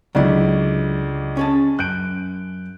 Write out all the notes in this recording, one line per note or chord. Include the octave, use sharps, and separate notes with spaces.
C#2 D3 F#3 E4 D5
C#4 G#4 A5
F#2 F#6 G6 D7